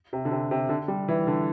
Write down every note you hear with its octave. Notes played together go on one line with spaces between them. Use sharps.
C3
D3
C3
C3
D3
G3
E3
D3